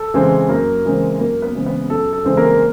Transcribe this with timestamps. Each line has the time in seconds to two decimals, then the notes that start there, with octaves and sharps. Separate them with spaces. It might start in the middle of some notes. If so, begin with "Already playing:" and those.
Already playing: A4
0.14 C#3 E3 G#3 C4
0.49 F#2 A#3 A#4
0.85 C#3 E3 G#3 C4
1.19 F#2 A#3 A#4
1.42 B3 B4
1.55 C#3 E3 G#3 C4
1.66 B3 B4
1.89 F#2 A4
2.13 A4
2.24 C#3 E3 G#3 C4
2.37 A#3 A#4